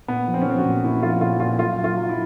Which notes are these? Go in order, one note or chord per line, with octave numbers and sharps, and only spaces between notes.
A#2 B3
F3
C4
C#4
F3 C4
F#4
A#2
A#2 E4
F3 F4
A#2 F4
A#2 F4
F#3 F4
F#3
F4
F#3
E4